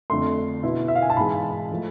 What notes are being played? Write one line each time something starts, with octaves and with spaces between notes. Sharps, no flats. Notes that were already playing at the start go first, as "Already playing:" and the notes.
F2 D3 A3 C6
B2 B3 E4
E5
F5
G#5
A5
G#2 E3 G#3 B5
F3 A3